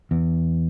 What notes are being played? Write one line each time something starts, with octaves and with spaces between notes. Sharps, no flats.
E2